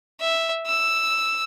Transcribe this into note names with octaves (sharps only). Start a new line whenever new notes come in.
E5
E6